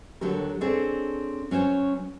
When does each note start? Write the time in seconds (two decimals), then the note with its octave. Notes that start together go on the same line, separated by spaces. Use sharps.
0.21 D#2 D3 F#3 G4 A#4
0.61 C4 D4 G#4 A4 C#5
1.51 F#3 C#4 C5 C#5